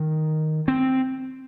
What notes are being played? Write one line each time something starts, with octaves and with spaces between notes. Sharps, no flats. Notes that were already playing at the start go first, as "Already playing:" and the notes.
Already playing: D#3
C4